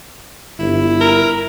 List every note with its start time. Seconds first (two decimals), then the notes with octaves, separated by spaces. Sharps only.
0.59 G1 E4
1.01 A#4